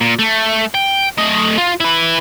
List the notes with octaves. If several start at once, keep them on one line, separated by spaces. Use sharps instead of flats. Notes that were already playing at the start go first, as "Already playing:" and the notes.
A#2
A3
G5
A3 D#5
F4
E4 B4